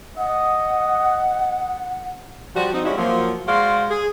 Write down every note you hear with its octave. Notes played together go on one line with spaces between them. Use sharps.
D#5 F#5
F3 G3 F#4
C4 D#4
G3 G#3 C#4 E4 F#4 D#5
F3 F#3 A#3
G#3 F#4 C5 D5 F5
G#4